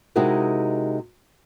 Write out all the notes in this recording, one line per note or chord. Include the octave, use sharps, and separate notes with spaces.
C3 G#3 D#4 E4 F#4 A#4